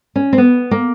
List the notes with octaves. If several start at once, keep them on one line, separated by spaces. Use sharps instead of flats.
C#4
C4
B3
A#3